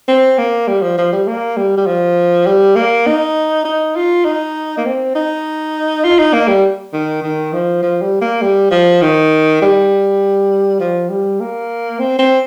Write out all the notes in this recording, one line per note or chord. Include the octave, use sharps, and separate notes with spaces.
C4
A#3
G3
F3
F3
G3
A#3
G3
G3
F3
G3
A#3
D#4
D#4
F4
D#4
A#3
C4
D#4
F4
D#4
A#3
G3
D#3
D#3
F3
F3
G3
A#3
G3
F3
D#3
G3
F3
G3
A#3
C4
C4